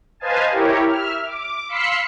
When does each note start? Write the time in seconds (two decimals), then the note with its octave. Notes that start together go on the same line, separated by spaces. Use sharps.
0.20 B4 C5 D#5 F5 G#5 A5
0.51 E4 G4 A#4 C#5
0.88 E5 F6
1.25 D6
1.68 F5 B5 C6 E6 B6 C#7